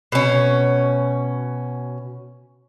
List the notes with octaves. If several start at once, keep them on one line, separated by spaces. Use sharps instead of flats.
B2 C#4